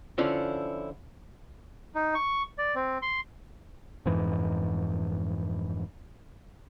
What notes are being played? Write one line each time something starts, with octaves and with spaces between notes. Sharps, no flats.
D3 F3 C#4 E4 F4
D#4
C#6
D5
C4
C6
F2 G#2 E3